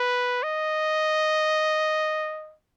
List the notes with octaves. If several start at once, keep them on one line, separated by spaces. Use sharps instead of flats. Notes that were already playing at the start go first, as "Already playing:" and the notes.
Already playing: B4
D#5